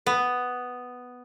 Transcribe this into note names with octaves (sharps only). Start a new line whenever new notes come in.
B3